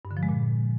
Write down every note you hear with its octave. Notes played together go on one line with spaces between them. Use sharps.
G2
D3
F3
G#3
A#2